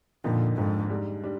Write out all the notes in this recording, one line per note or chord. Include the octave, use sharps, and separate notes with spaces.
F2 A#2 D3 F3 A#3 D#4
F2 G#2 D3 F3 A#3 D#4
G#2 G3 D4
G3 D4